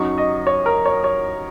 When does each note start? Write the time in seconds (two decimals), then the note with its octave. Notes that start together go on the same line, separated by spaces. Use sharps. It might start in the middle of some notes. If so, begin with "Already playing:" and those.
Already playing: F#2 F#3 D#4 C#6
0.18 D#5
0.47 C#5
0.66 A#4
0.86 C#5
1.04 C#5